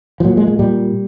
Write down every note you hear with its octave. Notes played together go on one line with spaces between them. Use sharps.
F3
A#2 F#3
G#3
G#3
A#2 G3